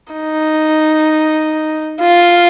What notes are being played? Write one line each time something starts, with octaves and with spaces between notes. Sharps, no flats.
D#4
F4